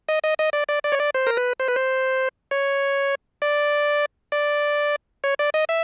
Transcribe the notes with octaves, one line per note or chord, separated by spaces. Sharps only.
D#5
D#5
D#5
D5
D5
D5
C#5
D5
C5
A#4
B4
C5
B4
C5
C#5
D5
D5
C#5
D5
D#5
E5